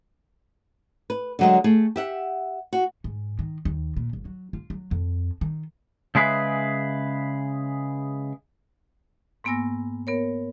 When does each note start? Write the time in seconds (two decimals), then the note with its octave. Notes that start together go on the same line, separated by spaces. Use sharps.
1.10 B4
1.39 D3 F#3 G#3
1.64 A3 G#4
1.96 G4 E5 F#5
2.73 F#4
3.04 G#2
3.39 D#3
3.65 D#2
3.96 A#2
4.13 G1
4.25 F#3
4.53 F4
4.70 F#3
4.91 F2
5.41 D#3
6.15 C#3 G#3 G#4 B4 E5
9.44 G#2 A#3 B3 G#5 E6 A#6
10.07 B3 A#4 C#5